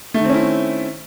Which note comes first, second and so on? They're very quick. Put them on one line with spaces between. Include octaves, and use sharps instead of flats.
A3 D#3 C4 C#4 E4